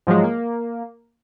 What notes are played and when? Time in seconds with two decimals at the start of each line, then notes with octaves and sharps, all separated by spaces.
0.07 G#2 F3 F#3 G#3
0.24 A#3